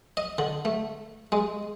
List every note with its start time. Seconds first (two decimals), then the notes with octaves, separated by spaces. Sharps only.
0.17 D#5
0.38 D3
0.65 A3
1.32 G#3